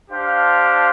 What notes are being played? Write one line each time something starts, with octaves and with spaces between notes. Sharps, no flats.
D4 G4 C5 F5